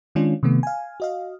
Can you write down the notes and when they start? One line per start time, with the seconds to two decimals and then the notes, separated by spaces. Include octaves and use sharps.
0.15 D#3 G#3 C#4 D4 F4
0.43 C3 D#3 A3 B3
0.63 F5 G#5
1.00 F#4 D#5 F5